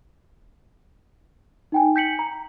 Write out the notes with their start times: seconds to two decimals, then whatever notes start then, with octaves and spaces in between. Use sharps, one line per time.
1.72 D#4 G5 G#5
1.96 G6 B6 C#7 F#7
2.19 A#5